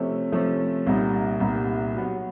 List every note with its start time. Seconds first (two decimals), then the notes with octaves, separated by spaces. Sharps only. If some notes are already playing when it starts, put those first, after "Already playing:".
Already playing: C3 F3 A3 C#4
0.32 C3 F3 A3 C#4
0.87 C2 A#2 G3 B3 D#4
1.40 C2 A#2 G3 B3 D#4
1.94 B2 F#3 B3